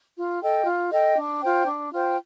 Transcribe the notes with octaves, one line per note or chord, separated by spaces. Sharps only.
F4
A4 D#5 G5
F4
A4 D#5 G5
D4
F4 C5 G5
D4
F4 C5 G5